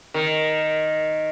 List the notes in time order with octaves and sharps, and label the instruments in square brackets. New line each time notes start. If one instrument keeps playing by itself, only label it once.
[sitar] D#3